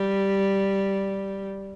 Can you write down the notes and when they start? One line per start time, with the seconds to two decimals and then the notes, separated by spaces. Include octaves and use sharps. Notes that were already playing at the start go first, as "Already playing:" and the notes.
Already playing: G3